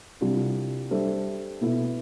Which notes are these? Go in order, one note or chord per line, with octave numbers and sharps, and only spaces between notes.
C2 C3 G3 D4 F4
G3 D4 A4 C5 E5
B2 B3 E4 A4 E5